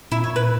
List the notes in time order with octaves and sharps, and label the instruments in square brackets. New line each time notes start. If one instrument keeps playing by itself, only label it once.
[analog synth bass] A#2 [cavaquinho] E4
[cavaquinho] C#5
B4